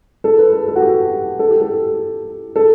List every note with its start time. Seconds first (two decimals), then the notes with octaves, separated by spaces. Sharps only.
0.24 A4
0.39 B4
0.53 A4
0.68 A4
0.76 F#4
0.82 G4
1.39 A4
1.51 G4
1.61 A4
2.56 A4